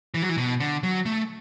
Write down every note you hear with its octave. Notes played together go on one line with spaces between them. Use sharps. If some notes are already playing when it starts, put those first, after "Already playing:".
E3
F#3
E3
B2
D3
F#3
A3